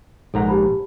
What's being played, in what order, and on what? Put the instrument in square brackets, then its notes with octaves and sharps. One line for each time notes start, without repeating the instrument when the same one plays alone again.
[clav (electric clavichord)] A#1 G#2 A#5 [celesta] A4 F#5
[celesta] G4 A5 B5